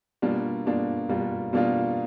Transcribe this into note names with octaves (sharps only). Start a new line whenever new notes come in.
B2 G3 A#3 D4 F4
B2 G3 A#3 D4 F4
B2 G3 A#3 D4 F4
B2 G3 A#3 D4 F4